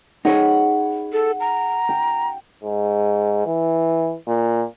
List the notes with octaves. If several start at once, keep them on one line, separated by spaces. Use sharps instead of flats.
D#4 G#4 C#5 F#5 B5
A4
A#5
G5
G#2
E3
A#2